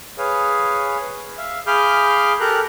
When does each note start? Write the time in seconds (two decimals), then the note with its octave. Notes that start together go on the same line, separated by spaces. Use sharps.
0.18 G#4 B4 C#5 F5
1.38 E5 F5
1.67 G#4 F5 B5 D6 F6 G6
2.40 G4 A4 A#4 A#5 F#6